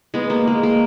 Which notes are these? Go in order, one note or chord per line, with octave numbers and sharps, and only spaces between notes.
G#3 B3
A#3
G#3
A#3